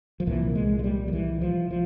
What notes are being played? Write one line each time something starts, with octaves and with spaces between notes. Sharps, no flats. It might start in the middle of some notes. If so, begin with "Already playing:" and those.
F3
C2 A#2 E3
G#3
G#3
G3
F3
E3
F3
F3